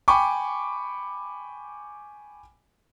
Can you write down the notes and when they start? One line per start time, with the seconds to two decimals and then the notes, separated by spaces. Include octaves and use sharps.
0.08 G5 G#5 B5 C#6 D6